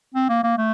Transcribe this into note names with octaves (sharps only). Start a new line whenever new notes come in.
C4
A#3
A#3
A3